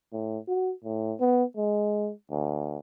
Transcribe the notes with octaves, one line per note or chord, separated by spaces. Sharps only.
A2
F#4
A2
B3
G#3
D2